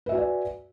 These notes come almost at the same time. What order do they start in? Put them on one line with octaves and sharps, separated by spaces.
B4 E5 F#4 G#5 D5